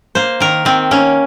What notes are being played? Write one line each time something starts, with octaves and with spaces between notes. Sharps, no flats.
A#3 C5
D#3 A#4
D#3 C4
A#3 C#4